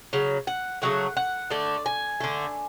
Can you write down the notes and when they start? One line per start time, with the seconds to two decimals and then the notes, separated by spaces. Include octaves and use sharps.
0.13 C#3 F#3
0.47 F#5
0.82 C#3 F#3 A3 F#5
1.17 F#5
1.50 D3 A3 D5
1.86 G#5
2.21 D3 A3